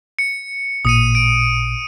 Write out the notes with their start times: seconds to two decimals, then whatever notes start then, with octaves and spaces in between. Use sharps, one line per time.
0.19 C#7
0.85 A1 A#2 D#6 C#7 D#7
1.15 D7